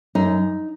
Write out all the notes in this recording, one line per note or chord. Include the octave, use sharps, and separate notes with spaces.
F#2 D#4